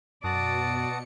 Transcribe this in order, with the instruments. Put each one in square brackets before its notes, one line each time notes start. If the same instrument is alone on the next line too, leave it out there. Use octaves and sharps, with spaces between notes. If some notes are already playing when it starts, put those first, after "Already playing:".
[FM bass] F#2 [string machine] B2 C#7 [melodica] F#4 A5 D#6 [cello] D5